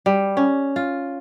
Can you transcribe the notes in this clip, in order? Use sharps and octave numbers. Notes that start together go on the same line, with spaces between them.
G3
C#4
F4